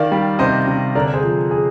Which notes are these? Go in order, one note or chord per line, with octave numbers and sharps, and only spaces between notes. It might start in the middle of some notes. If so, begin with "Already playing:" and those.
Already playing: D#3 D5 F5
G3
C3 C5 D#5
C3
D3 A#4 D5
G#4 C5
F3
G#4